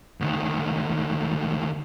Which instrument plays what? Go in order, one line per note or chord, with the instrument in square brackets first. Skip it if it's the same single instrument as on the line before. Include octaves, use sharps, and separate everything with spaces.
[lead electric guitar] D2 D#3